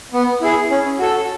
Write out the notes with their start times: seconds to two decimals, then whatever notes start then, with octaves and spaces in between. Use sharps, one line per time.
0.13 B3
0.41 E4 G#4
0.70 C#4
0.99 F#4 A4